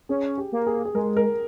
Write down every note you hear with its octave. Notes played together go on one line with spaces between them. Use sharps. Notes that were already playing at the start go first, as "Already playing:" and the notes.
C#4 G#4
G4
A#3
G#4
G#4
G#3 A#4
A#4